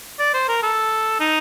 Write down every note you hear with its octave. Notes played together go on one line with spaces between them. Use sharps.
D5
C5
A#4
A4
D#4